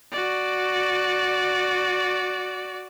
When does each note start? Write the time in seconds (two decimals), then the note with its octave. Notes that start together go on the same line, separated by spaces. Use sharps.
0.12 F#4 D5